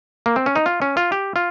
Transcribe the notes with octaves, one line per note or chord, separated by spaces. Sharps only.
A#3
C4
C#4
D#4
F4
C#4
F4
G4
F4